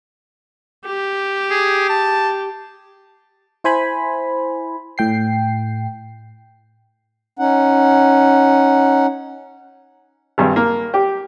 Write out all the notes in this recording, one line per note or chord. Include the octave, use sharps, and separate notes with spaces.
G4
G#4
A5
E4 C5 G#5 B5
A2 G5 C7
C#4 D#4 F#5
G#1 G2
A#3
G4